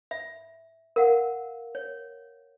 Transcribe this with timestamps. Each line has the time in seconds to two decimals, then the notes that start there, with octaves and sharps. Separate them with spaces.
0.11 E5
0.96 A#4 F5 F#5
1.75 C#5